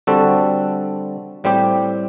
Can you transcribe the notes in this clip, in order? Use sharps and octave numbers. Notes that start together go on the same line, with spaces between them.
D3 G3 C4 F#4 A4
A2 G3 C4 G4